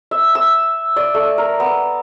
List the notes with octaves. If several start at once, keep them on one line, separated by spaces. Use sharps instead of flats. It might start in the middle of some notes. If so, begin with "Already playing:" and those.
E5
E6
D5
A3
A#4
B3